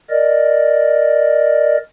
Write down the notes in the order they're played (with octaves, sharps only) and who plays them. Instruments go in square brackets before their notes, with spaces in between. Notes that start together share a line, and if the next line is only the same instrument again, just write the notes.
[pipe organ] A#4 D5 D#5